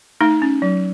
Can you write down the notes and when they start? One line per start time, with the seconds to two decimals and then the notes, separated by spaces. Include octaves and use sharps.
0.21 A3 D#4
0.42 C#4
0.62 F#3